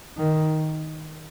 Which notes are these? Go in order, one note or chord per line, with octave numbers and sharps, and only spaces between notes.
D#3